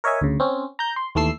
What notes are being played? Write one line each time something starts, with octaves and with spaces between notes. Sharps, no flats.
A#4 C#5 D#5 E5 G#5
D2 C#3
C4 C#4
A#5 G6
C6
D#2 E3 A3 A4 E6 C7